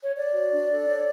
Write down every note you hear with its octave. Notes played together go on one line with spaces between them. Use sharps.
C#5
C#5 D5
F#4
D4
A4
C#5